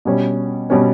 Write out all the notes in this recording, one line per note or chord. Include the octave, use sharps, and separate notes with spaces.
B2 G3 C#4
B2 G3 C#4